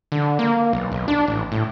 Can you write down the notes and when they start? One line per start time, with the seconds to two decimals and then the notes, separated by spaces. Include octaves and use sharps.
0.12 D3
0.39 A#3
0.73 B1
0.92 B1
1.08 D4
1.28 A1
1.52 A2